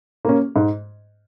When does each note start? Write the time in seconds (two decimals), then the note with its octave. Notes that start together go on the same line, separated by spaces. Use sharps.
0.25 A#3 C#4
0.56 G#2